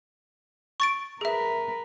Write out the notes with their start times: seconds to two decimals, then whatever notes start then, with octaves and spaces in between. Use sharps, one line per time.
0.80 C#6 A6 D7
1.21 G#4 A#4 B4 E5